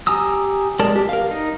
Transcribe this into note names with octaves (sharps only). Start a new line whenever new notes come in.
G4 G#5 A#5 D#6 E6
G#3 A#4 D5 A5
G4
A#4 F5
D#4